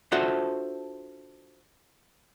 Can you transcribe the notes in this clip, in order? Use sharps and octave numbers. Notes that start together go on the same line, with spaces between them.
D4 F4 F#4 A4 C5 E5